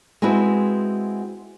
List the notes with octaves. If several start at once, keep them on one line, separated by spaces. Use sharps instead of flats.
G#3 B3 C4 E4 F#4